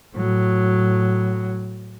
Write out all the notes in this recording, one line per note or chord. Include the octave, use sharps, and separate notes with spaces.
A2 F#3